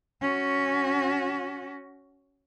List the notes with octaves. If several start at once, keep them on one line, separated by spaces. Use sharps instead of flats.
C#4 F#4